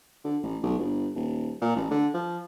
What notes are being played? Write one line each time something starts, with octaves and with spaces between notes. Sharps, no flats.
D3
A1
B1
G1
D#1
A#2
A1
D3
F3